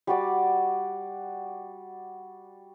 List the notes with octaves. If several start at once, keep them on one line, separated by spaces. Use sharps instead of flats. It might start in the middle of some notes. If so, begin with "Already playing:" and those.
G3 F#4 D5